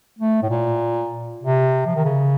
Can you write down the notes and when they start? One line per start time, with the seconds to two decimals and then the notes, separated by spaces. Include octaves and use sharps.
0.19 A3
0.43 A2
0.49 A#2
1.43 C3
1.86 F3
1.95 D#3
2.05 C#3